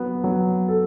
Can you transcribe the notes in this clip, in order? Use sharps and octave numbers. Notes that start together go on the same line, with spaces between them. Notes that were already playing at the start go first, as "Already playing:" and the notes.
Already playing: F#3 B3
F#3
A4